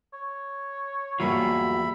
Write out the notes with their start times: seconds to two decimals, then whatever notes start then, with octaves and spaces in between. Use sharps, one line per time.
0.13 C#5
1.20 E2 G3 A#3 F4 F#4 G#4 E5 B5